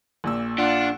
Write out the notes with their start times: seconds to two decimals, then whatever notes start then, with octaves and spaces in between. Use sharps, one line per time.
0.24 A#1 A#2 E6
0.58 D4 F4 F#5